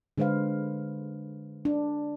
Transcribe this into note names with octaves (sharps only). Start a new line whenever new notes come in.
D3 G#3 B4 C5 F5
D4